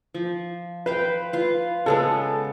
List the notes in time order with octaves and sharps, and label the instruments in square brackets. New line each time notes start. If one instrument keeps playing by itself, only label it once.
[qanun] F3
[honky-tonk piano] B4 [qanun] C5 F5 G5
[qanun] F4 F5
[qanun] C#3 G#3 B3 [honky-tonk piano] A4